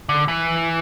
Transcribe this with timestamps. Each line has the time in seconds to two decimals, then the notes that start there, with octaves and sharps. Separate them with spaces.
0.09 D3
0.28 E3